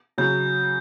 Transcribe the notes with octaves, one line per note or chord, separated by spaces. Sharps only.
C#3 F#3 G6